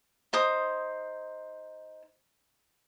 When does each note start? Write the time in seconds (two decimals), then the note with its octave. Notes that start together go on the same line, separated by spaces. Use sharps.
0.33 D#4 C5 D#6